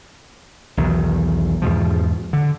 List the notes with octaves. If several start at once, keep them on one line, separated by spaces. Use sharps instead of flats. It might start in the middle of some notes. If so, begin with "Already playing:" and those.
B1 E2 D#3
E2 G#2 B2 F3
D3